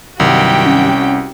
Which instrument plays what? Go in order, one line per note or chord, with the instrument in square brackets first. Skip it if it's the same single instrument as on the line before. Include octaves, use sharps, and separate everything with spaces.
[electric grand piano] C2 [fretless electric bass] G2 D#3 F#3 [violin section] F#4 G4 G5
[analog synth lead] C#4